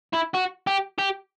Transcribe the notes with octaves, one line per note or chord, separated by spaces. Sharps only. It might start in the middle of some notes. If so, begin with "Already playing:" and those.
E4
F#4
G4
G4